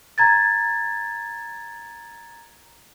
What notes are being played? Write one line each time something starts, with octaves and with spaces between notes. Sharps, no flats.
A#5 G#6 A6